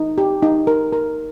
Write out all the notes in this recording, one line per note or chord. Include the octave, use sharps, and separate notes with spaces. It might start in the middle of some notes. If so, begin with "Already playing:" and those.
Already playing: D#4
G4
D#4
A#4
A#4